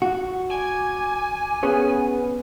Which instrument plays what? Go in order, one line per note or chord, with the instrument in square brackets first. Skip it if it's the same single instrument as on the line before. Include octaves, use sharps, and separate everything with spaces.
[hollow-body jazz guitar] F#4
[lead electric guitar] G#5 [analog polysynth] D6 G#6
[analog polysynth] B3 [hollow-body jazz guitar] C#4 G#4 C#5